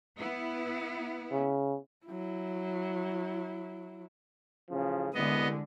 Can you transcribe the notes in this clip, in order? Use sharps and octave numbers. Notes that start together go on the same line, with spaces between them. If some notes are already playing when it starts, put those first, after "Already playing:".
B3 E4
C#3
F#3 E4
A1 C#3 F3
C2 D3 G#3 B3 D#5